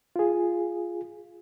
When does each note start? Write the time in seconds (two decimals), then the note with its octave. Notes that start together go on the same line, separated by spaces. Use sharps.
0.16 F4 G#4